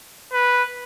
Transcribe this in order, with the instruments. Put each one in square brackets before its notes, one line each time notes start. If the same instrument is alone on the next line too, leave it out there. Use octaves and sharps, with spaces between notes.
[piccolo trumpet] B4